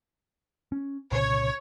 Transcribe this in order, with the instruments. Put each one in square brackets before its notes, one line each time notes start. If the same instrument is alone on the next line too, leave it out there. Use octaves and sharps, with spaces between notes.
[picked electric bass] C#4
[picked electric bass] C2 A#2 C#3 [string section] C#5